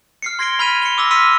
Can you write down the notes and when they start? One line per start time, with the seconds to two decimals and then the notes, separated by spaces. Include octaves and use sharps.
0.22 F6 C7 C#7
0.39 C6 G#6 A#6 C7 D7 G7
0.59 B5 F6 G#6 B6 D#7 F7
0.82 C#7 G7
0.98 D6 E6 F6 A#6
1.11 C6 E6 F6 B6 C#7 D#7